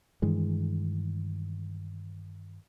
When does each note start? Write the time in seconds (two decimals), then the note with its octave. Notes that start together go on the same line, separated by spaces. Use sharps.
0.22 G2 D#3 E3 G#3